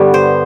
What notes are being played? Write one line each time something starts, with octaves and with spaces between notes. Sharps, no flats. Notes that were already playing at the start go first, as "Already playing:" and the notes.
Already playing: G2 D3 G3 B3
C5